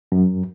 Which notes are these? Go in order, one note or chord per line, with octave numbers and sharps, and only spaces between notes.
F#2